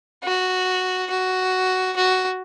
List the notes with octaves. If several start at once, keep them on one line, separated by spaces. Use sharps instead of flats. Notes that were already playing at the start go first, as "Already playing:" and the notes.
F#4
F#4
F#4